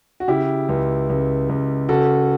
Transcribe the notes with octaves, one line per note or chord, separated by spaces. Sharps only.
F#4
C#3 E4 G4
C#2
C#2
C#2
C#3 F#4 A4